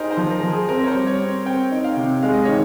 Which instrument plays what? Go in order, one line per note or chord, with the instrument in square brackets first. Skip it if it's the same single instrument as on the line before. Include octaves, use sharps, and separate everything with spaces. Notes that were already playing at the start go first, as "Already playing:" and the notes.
Already playing: [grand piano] D#4 [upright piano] G4 G#4 A#4 C5
[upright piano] C5
[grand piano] F3
[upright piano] A#4
[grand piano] F3
[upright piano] G#4
[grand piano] C4 [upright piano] A#4
[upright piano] C#5
C5
[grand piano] G3
[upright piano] C#5
[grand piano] C4
[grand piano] C4 [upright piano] G5
[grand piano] D#4
[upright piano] F5
[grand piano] C3
[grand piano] G#3 [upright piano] F5
[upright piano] D#5
[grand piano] D#3 [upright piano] C#5